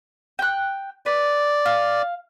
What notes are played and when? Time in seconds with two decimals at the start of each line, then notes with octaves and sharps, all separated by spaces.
0.39 G5 F#6
1.06 B4 D5
1.66 F5